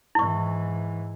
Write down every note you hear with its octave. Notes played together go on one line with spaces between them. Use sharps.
G#2 E3 E4 C#6